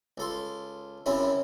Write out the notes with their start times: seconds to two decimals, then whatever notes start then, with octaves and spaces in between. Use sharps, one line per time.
0.18 C#2 A4 C6
1.06 F#2 C#3 C4 C#4 E4